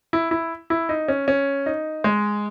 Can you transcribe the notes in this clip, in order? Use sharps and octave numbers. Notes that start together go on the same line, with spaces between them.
E4
E4
E4
D#4
C#4
C#4
D#4
G#3